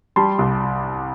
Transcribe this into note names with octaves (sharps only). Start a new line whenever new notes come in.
G3 A5 C6
C2